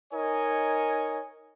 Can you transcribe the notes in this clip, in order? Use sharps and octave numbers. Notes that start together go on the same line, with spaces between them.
D#4 A#4 C#5 D#5 G#5